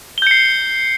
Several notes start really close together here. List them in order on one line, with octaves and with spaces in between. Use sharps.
G7 G6 C#7 C7